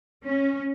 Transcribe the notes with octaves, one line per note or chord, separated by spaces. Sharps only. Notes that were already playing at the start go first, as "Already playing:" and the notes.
C#4